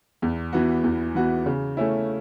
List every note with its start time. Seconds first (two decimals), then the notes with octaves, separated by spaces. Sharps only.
0.22 E2
0.53 E3 B3 F#4
0.84 E2
1.15 E3 B3 F#4
1.46 C#3
1.77 A3 C#4 E4